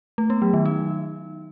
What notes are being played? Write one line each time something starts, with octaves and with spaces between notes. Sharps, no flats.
A3
B3
F#3
D#3
D#4